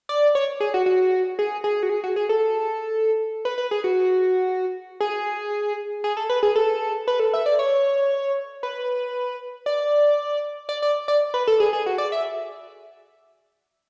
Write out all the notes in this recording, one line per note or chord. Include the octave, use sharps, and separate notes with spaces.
D5
C#5
G#4
F#4
F#4
G#4
G#4
F#4
G#4
F#4
G#4
A4
B4
B4
G#4
F#4
G#4
G#4
A4
B4
G#4
A4
B4
A4
E5
D5
C#5
B4
D5
D5
D5
D5
B4
A4
G#4
G#4
F#4
D5
E5